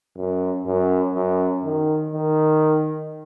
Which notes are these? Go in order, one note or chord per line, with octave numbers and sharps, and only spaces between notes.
F#2
F#2
F#2
D#3
D#3